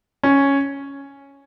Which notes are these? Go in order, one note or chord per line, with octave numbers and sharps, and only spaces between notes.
C#4